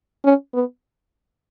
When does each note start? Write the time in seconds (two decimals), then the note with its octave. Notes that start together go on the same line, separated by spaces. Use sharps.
0.24 C#4
0.54 B3